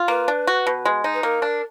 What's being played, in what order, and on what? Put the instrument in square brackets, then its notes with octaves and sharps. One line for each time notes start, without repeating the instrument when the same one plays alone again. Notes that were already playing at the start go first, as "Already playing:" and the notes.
Already playing: [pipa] F4
[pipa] A#3 [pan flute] B4
[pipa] D4
F#4
B2
G#3
D#4
[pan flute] B4
[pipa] A#3 [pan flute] A#4
[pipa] D4